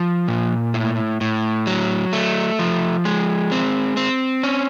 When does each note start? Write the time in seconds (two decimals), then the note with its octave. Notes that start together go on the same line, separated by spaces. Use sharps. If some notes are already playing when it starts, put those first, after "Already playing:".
Already playing: F3
0.28 A#2
0.74 A2
1.21 A2
1.67 F#3
2.13 A3
2.59 F3
3.05 G#3
3.52 C4
3.97 C4
4.43 C#4